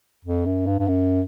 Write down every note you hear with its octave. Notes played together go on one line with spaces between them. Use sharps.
F2
F#2
G2
G2
F#2